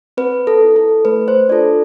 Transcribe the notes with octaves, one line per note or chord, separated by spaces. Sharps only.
C4 B4
A4
E4 A4
A4
A3 B4
C5
D4 F4 A4 D5